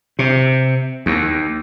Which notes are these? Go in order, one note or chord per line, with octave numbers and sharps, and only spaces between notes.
C3
D#2